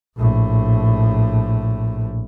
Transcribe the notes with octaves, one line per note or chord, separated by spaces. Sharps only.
A#1 A2